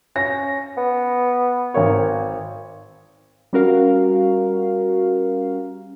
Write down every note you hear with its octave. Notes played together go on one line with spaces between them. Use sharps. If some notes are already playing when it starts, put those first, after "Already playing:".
C#4 A#6
B3
G#1 A#4 C#5
G3 C#4 F#4 A#4 F5